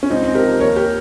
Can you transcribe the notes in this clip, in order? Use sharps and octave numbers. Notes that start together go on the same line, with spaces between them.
C#4
C#2 C4 D#4
C4
C3 F3 G4 A#4
D#2 A#4 C#5
G4 A#4